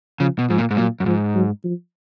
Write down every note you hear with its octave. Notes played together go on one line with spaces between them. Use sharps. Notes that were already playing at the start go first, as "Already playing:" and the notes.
C#3 F3
B2
G#2 F3
A#2
G#2
A#2 F#3
F#2
G#2 F3
F#3
F3